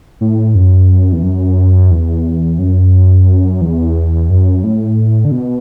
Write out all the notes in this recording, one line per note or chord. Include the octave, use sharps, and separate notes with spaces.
A2
F#2
E2
F#2
E2
F#2
E2
F#2
A2
D3
B2